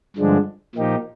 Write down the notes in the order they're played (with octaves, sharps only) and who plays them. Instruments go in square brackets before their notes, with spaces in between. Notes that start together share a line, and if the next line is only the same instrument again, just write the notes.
[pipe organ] G2 D3 F3 G#3 D4
A#2 F3 A#3 D#4 G4